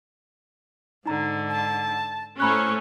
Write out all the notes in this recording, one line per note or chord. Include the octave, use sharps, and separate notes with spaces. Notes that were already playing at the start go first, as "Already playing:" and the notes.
G#2 D3 D#4 A#5
A5
A2 A3 C#4 C5 A#5 B5 C#6 F#6